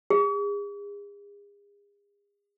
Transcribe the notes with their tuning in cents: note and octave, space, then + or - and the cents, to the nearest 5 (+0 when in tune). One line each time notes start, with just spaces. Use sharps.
G#4 -40